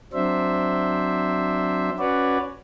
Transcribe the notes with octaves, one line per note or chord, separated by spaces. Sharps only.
F#3 C4 D4 C5 E5
C#4 F#4 B4 C#5 D5